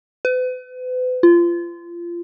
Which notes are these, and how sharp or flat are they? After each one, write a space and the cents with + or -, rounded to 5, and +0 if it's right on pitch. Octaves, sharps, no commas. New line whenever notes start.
B4 +40
F4 -25